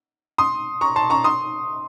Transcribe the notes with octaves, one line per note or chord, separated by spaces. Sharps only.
C6 D#6
A#5 C#6
A5 C6
A#5 C#6
C6 D#6